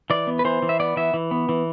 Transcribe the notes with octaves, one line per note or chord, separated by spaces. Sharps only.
E3 D5
B3
B4
E3 C5
E3
E5
B3 D5
E3 E5
E3
B3
E3